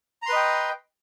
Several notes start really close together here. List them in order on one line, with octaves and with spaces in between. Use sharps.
A#5 C6 B4 D#5 G5